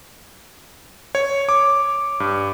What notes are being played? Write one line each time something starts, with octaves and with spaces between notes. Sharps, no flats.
C#5
D6
G2